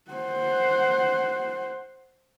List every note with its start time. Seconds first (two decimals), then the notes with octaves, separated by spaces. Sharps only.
0.11 C5 F#5